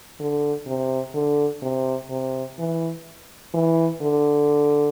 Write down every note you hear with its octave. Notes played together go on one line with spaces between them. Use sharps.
D3
C3
D3
C3
C3
E3
E3
D3